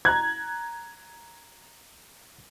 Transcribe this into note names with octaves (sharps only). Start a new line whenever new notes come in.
A#5 F#6 G#6